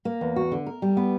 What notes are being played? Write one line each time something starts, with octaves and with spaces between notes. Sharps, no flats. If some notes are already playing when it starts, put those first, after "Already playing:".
A#3
E2
F#4
D3
A#4
G3
B3